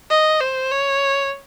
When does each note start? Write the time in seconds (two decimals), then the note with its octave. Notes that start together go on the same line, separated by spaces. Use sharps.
0.10 D#5
0.41 C5
0.71 C#5